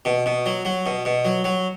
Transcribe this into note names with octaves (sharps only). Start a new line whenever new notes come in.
B2
B2
F#3
F#3
B2
B2
F#3
F#3